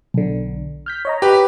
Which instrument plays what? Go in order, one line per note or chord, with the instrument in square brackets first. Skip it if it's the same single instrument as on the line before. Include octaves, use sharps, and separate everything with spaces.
[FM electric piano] B1 D3
F6 G6 B6
C#5 D#5 A#5
[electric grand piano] G4 B4